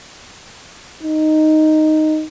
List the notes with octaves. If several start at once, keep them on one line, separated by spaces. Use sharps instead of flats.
D#4